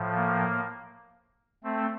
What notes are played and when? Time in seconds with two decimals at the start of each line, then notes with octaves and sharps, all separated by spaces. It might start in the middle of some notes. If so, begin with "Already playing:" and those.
Already playing: A2 F3
0.15 A#3
1.64 A3 C4